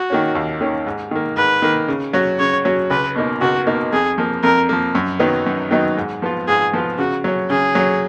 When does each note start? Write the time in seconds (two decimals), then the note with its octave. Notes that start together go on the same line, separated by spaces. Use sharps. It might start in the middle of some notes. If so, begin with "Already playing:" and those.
Already playing: F#4
0.10 D#3 A#3 C#4
0.35 D#2
0.61 D#3 A#3 C#4
0.86 G#2
1.11 D#3 A#3
1.37 G#2 B4
1.62 D#3 A#3
1.88 C#3
2.13 F#3 C#4 F#4
2.39 C#3 C#5
2.65 F#3 C#4 F#4
2.90 C#2 B4
3.16 B2 A#3 D#4
3.41 C#2 F#4
3.66 B2 A#3 D#4
3.93 F2 G#4
4.18 F3 A#3
4.43 F2 A#4
4.69 F3 A#3
4.95 F#2
5.20 D#3 F#3 B3 D#4
5.46 F#2
5.71 D#3 F#3 B3 D#4
5.97 G#2
6.22 F3 B3 F4
6.48 G#2 G#4
6.73 F3 B3 F4
6.98 C#3 F#4
7.24 F#3 C#4
7.50 C#3 G#4
7.75 F#3 C#4